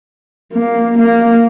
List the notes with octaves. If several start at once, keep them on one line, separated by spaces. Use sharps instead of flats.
A#3
A#3